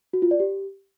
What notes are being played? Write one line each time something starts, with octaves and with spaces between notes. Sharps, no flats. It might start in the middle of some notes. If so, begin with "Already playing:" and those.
F#4
F4
D5
G4